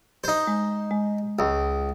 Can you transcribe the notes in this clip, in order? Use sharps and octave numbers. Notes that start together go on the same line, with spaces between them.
D#4 C5
G#3
G#3
C#2